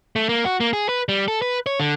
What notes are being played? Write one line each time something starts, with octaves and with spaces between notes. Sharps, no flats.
A3
A#3
F#4
A#3
G#4
B4
G3
A4
B4
C#5
D3